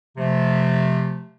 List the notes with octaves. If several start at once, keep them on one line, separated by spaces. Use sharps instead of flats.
C3 F3 A3